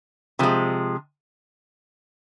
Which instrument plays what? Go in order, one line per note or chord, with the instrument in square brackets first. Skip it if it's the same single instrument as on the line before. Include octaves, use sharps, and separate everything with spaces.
[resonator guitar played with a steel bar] C3 F3 G#3